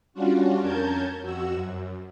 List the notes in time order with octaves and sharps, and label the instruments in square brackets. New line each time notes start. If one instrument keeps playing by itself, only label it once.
[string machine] G3 C#4 D4 F4 F#4
F2 C#4 A#4 A5 G6 G#6
F2 F#4 E6
F#2